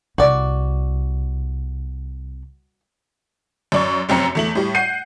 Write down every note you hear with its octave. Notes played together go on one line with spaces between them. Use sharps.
C2 F#4 D5
F#2 D5 C#6
F1 F#2 C4 A#5 C#7
E2 A3 F#7
A2 G3
F#5 G6 C7 D#7